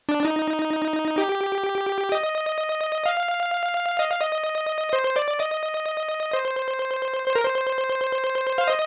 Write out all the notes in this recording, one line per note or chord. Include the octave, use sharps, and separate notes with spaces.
D4
D#4
G4
D#5
F5
D#5
F5
D#5
C5
D5
D#5
C5
C5
A#4
C5
F5
D#5